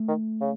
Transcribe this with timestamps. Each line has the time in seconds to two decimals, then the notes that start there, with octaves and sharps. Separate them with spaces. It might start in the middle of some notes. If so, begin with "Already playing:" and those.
Already playing: A3
0.08 D#3
0.41 C#3